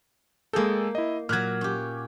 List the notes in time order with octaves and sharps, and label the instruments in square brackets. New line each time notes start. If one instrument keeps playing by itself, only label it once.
[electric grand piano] G#3 G#4 A4 [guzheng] A#3 G5
[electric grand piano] E4 D#5
[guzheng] A#2 F#3 [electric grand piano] F6 F#6 G#6
[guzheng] C#4 G4